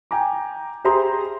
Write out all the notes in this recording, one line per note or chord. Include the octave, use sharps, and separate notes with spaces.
G5 G#5 A#5 D6
G4 G#4 C5 E5 A#5 C6